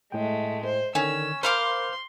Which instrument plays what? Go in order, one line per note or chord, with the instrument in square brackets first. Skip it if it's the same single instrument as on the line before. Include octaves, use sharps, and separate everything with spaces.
[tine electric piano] A2 G5 [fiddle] G#3 A3
[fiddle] C5
[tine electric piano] D3 D#3 G#5 [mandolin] C#4 [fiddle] E6
[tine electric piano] A#4 B5 [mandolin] C5 F5 D6 [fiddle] C6